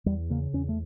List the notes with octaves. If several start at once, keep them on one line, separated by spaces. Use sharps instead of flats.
E2 G3
C#3 A#3
E2 C#4
A3